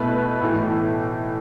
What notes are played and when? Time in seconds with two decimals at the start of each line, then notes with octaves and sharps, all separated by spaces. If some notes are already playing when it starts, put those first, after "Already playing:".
Already playing: B2 A3 E4 B4
0.41 A2 E3 A3